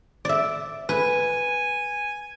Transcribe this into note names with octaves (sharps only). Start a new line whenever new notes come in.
D5 E5
B4 G#5